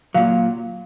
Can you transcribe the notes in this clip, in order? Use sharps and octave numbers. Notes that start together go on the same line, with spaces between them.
A#2 F#3 F5